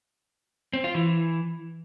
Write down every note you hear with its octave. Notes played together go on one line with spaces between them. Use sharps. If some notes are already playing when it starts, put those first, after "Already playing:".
C4
F4
E3